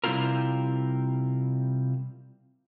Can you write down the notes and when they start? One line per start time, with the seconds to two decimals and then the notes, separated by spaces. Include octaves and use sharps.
0.04 C3 G3 C4 E4 F4 A#4